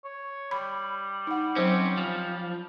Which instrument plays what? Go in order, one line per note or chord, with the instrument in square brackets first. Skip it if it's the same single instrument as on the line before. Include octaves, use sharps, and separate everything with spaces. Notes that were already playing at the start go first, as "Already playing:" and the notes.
[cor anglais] C#5
[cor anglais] G3 [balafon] B5
[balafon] D#4 F#5
[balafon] F#3 C5 [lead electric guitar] C4 C#4
[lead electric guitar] F3